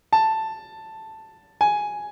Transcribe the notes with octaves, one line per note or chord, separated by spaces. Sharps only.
A5
G#5